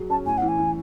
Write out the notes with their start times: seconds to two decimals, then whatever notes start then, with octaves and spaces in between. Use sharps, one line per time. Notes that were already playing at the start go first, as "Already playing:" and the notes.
Already playing: F#3 G#4
0.10 C#4 A5
0.26 A2 G#5
0.38 E3 F#5
0.48 G#5
0.58 E3